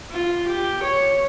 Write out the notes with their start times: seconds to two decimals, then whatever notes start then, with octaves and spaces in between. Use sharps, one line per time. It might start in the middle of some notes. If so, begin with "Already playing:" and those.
0.10 F4
0.47 G4
0.82 C#5